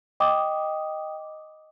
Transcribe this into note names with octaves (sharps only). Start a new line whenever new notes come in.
D#5 G5 D6 D#6